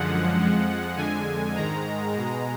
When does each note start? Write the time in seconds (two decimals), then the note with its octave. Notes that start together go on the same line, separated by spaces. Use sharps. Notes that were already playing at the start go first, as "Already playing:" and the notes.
Already playing: F#2 D3 F3 G#3 F#5
0.37 F2 F3 G#3
0.96 F2 D3 G#3 G#5
1.55 G#2 D#3 G#3 A#5
2.13 B2 G#3